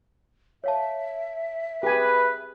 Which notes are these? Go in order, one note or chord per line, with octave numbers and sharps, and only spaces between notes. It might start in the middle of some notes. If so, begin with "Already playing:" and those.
C#5 E5 F5 A5
G4 G#4 B4 G#5